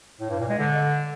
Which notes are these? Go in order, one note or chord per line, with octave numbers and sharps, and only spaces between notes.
A2
G2
A#2
G#3
D3